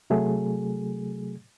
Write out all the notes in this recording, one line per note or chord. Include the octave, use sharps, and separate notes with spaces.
C3 F#3 A3 G#4